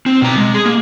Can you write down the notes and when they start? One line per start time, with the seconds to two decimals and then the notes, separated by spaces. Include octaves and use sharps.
0.06 C4
0.22 B2 A#5
0.37 G#3
0.54 G#4
0.66 A#3